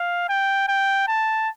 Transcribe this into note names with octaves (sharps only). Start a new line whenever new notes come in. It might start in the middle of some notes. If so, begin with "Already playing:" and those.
Already playing: F5
G5
G5
A5